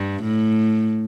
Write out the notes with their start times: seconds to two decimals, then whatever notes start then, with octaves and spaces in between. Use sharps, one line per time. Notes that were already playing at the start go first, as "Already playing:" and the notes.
Already playing: G2
0.22 A2